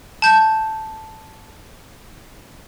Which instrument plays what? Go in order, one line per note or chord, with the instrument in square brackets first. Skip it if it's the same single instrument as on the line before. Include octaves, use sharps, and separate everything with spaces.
[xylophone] A5 G6